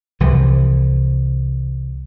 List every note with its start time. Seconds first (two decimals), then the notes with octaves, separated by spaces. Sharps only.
0.20 C2 E3 F3